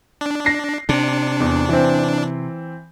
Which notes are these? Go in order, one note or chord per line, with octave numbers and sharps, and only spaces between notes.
D4
A#6 C7
C3 D4
E2
E3 C4